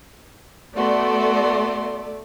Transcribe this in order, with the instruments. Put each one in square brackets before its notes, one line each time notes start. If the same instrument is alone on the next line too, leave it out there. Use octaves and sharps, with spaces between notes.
[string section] A3 D5 [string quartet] B3 F#4 C6